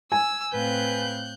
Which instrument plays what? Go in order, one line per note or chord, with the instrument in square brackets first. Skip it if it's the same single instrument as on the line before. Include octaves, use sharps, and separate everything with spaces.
[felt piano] G#5 [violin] E6
[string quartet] A2 C4 F5 [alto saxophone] B4 [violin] F#6 G6